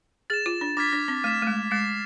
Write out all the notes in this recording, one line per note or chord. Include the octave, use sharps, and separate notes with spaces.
G#4 A6 E7
F4
D4
D4 D6 F6 G#6 B6
D4
C4
A3 F6 B6 E7
A3
G#3
G#3 D6 A6 C7 E7